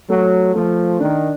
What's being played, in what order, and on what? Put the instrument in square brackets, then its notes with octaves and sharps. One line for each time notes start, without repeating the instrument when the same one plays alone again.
[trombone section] F#3 [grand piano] A3
[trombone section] F3 [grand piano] A3
[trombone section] D#3 [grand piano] D4